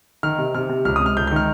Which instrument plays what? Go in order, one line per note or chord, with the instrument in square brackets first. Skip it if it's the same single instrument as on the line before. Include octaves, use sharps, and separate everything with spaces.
[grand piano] D#3 F6
C3
C3 F6
C3
C#2 F6
D#6
C3
F6
C#2 G6
D#3 G6
F6